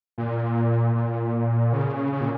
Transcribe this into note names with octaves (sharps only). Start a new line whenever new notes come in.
A#2
A#2
C#3
C#3
A#2